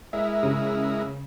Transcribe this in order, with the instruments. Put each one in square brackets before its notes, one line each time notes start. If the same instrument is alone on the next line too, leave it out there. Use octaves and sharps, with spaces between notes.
[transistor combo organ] G#3 E4 A#4 [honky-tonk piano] E5
[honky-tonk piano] C#3